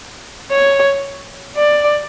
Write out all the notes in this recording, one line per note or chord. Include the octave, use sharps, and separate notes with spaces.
C#5
D5